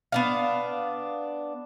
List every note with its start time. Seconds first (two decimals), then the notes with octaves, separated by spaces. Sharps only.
0.12 B3 D4 F5